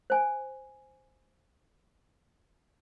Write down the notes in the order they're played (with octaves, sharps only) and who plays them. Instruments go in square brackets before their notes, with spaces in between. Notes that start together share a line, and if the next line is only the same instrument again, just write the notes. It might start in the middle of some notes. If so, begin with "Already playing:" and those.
[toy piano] C5 G#5